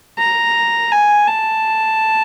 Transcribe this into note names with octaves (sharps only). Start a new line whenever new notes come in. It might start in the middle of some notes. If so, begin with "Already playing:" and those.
A#5
G#5
A5